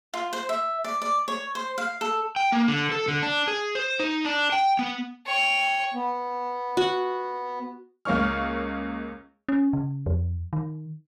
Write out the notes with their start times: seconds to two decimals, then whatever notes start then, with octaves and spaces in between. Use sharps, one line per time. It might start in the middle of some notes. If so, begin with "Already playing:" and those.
0.14 F4
0.33 C5
0.49 E5
0.84 D5
1.02 D5
1.28 C#5
1.55 C5
1.78 F5
2.01 A4
2.36 G5
2.52 A#3
2.68 D3
2.92 A4
3.08 D3
3.23 D4
3.48 G#4
3.75 C5
3.99 D#4
4.25 D4
4.52 G5
4.79 B3
5.26 C#5 G5
5.94 B3
6.77 F#4
8.05 C#2 A#3 C#4 C#6 F6
9.49 C#4
9.73 C#3
10.06 F2
10.53 D#3